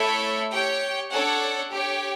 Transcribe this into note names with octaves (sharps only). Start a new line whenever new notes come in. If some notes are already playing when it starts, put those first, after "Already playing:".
Already playing: A3 E4 A4 C#5 E5
G4 C#5 G5
D4 A4 C#5 F#5
G4 C#5 G5